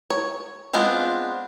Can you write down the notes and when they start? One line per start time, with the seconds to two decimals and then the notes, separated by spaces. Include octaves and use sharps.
0.10 C#5
0.73 G#3 B3 C4 D4 F4